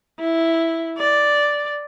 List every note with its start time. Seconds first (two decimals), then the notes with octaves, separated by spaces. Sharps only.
0.20 E4
0.98 D5